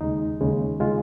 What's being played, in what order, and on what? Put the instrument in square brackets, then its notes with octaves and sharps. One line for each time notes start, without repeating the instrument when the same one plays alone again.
[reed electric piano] D#2 C#3 G#3 D#4
D#2 C#3 G#3
C#3 G#3 F4